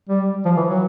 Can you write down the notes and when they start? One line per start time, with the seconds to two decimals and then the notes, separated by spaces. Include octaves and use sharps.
0.09 G3
0.45 F3
0.57 E3
0.68 F#3